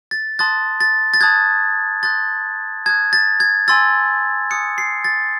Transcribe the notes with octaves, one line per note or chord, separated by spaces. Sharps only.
A6
A5 C6 D#6 F#6 A6
A6
A6
A5 D#6 F#6 G#6
C6 D#6 F#6 A6
A5 D#6 F#6 G#6
A6
G#6
G#5 C6 E6 A6
G#5 D#6 F#6 C#7
C7
A6